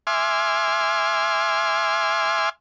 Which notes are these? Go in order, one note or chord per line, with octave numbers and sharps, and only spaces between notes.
E5 G#5 C6 D6 F6